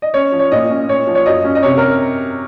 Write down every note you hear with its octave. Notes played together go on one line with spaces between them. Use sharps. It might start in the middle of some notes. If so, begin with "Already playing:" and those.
D#5
C#4 C#5
F3
C#5
A#2 D#5
C#4
A#2 C#5
F3
C#5
F#2 D#5
C#4
D#5
C3 C#5
A#4